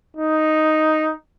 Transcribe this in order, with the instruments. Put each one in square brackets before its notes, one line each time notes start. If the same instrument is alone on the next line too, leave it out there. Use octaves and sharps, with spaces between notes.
[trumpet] D#4